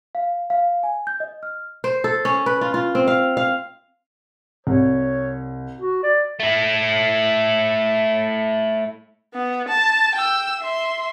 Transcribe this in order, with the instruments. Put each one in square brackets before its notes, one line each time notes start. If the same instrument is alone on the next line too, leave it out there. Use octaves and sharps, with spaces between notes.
[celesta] F5
F5
G#5
G6
D#5
F6
[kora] C5
A4
C#4
B4
F4
F4
C4
F5
F5
[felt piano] C2 [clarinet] C#5
[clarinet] F#4
D5
[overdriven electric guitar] A3 E4
[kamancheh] B3
A5
G5 E6
E5 C6